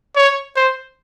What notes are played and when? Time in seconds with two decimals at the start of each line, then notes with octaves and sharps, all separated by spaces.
0.16 C#5
0.56 C5